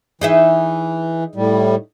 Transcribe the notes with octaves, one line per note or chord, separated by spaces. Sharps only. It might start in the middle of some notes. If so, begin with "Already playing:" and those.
E3 D#4 G#4 E5
A2 G3